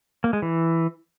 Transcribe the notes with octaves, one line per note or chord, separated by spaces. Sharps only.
A#3
G#3
E3